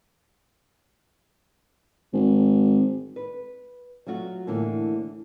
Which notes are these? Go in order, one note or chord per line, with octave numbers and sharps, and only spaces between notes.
G#1
B4
F#3 A3 F4 F#4
A2 D3 E3 A#3